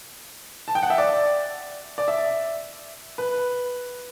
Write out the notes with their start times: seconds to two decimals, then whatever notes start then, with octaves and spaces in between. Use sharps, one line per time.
0.68 A5
0.75 G5
0.83 F#5
0.90 E5
0.98 D5
1.98 D5
2.08 E5
3.18 B4